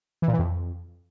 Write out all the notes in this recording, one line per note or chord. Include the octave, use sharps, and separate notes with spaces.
E3
A#2
E3
F2